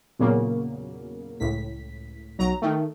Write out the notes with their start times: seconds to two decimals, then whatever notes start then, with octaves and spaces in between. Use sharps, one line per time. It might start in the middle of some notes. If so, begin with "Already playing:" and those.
0.19 E2 A#2 C#3 F#3 A#3
1.40 C#2 A2 B6
2.39 B1 F#3 A#5
2.62 D#3 A3